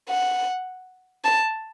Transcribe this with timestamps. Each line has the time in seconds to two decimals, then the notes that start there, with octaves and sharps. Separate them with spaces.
0.09 F#5
1.24 A5